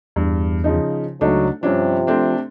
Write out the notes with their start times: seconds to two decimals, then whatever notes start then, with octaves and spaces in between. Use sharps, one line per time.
0.16 E2 G2
0.64 C#3 F3 D#4
1.21 C#2 F#3 A3 D4 D#4
1.63 G2 C3 F3 C#4 D4
2.07 A3 C4 D4